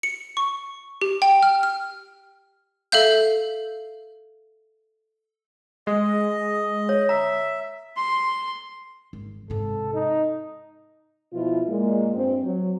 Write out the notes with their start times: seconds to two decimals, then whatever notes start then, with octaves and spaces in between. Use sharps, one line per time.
0.03 C#7
0.37 C#6
1.01 G4
1.22 G5
1.43 F6
1.63 F6
2.92 A4 E5 F5 G6
5.87 G#3 D#5
6.89 C#5
7.09 E5 A#5
7.97 C6
9.13 G#1
9.50 G#2 C3 A4
9.94 D#4
11.33 B2 F3 E4 F4
11.68 A#2 G#3 A#3
12.14 G2 C4
12.44 F#3